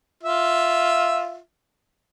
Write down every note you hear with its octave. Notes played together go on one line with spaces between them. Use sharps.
F4 E5